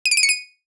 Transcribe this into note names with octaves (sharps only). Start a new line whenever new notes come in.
D#7
D7
D#7
C#7
D#7